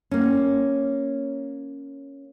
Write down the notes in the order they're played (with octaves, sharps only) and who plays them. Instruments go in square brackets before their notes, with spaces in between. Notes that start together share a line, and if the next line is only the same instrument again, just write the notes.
[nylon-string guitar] A#3 C#4